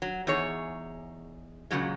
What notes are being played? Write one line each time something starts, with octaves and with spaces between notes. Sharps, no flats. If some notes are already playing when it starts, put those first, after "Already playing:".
F#3
E2 D#4 G#4 C#5
A#2 C#3 F#3 G#3